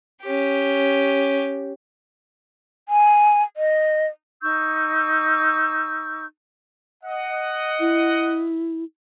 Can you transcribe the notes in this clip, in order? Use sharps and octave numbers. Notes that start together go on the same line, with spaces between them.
C#4 G4
G#5
D#5
D#4 C#6 E6 G6
D#5 F#5
E4